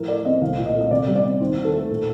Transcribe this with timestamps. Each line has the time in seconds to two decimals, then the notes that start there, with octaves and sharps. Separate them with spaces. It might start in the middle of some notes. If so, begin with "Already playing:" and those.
Already playing: A2 F3 A#4
0.08 A3 D5
0.25 C4 D#5
0.41 C2 F5
0.58 A#2
0.66 D#5
0.75 A3
0.81 D#5
0.91 C3 D5
1.07 G3
1.16 D5
1.24 C4
1.40 D#2 C5
1.57 D#3
1.65 A4
1.73 A3
1.90 A#2